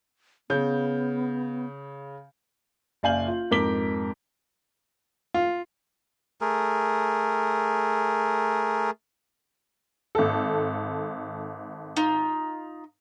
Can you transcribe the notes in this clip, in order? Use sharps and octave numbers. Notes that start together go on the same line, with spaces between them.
C#3 B3 G6
F#1 D5 F5 G#5 G6 F#7
F4
F2 G#2 A#4 D6 B6 G7
F4
A3 G#4 A#4
G#1 A4
D#4 F4